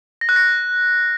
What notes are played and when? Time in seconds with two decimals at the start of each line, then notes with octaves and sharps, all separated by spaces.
0.21 A#6
0.29 F#6
0.36 A#6